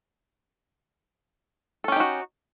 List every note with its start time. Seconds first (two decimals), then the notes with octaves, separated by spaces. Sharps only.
1.84 A4
1.88 C#4
1.92 G4
1.96 D#4
2.00 F#4